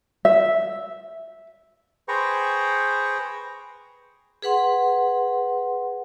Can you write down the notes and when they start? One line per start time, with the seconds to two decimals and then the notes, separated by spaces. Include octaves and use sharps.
0.25 E5
2.08 G#4 B4 C5 G5 A#5 C#6
4.42 G#4 B4 F#5 C6